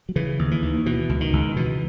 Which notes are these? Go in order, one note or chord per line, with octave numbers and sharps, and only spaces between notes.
F#3
C#3 E3
D#2
E3
D#2
B2 E3
C#2
D#3
C#2
B2 E3